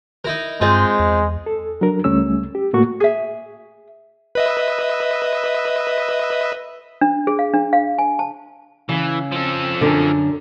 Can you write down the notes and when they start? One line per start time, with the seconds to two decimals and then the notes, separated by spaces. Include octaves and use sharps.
0.25 D#4 E4 A#4
0.61 G2 G#3 C4 D#4 F4
0.99 E2
1.46 A4
1.81 F#3 D4 A#4
2.04 C#2 G3 A3 C#4 E6
2.55 G4
2.73 A2 A3 A#3 F#4 C#6
3.00 G#4 E5
4.35 B4 D#5 E5
7.01 D4
7.27 G#4
7.39 F5
7.54 D4
7.73 F5
7.99 G#5
8.19 A5
8.89 C#3 E3
9.32 F3 A4
9.81 F#2 D3